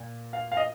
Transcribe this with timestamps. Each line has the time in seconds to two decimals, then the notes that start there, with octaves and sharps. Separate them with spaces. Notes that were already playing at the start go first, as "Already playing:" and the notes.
Already playing: A#2
0.33 F5
0.52 F5
0.57 D#5